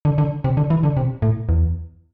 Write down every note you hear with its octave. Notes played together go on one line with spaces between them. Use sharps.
D3
D3
C3
D3
E3
D3
C3
A2
E2